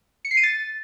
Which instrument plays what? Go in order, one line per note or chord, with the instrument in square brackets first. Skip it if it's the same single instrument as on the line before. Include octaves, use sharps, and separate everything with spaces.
[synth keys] C#7
C7
D#7
A6